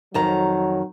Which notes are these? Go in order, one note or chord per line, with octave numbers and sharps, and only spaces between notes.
F2 D#3 F#3 A#5